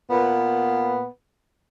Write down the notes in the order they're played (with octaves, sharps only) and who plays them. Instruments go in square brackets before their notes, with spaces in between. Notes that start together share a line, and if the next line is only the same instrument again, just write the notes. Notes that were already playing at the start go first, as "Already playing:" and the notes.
[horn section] A#2 B3